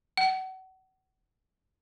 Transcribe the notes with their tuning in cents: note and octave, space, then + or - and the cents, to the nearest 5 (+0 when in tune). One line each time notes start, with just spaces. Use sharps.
F#5 +30